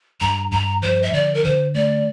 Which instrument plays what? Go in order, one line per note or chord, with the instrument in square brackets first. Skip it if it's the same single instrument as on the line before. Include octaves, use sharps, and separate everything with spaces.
[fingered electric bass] G2 [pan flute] A#5
[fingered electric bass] G2 [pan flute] A#5
[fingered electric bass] F3 [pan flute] C5
[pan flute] E5
[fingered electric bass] D3 [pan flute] D5
[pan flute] A#4
[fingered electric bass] D3 [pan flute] C5
[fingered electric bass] A3 [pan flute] D5